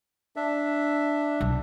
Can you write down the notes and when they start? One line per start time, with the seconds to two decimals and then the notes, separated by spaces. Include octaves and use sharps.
0.36 D4 E5
1.41 B1